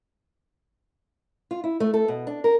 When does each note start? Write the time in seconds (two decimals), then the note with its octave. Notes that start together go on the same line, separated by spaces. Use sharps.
1.51 F4
1.64 E4
1.80 A3
1.94 A4
2.08 B2
2.27 D4
2.44 A#4